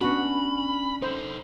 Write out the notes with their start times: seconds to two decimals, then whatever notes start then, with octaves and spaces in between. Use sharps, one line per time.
0.01 B3 C#4 D4 F#4 B5
1.02 D#4 A4 C5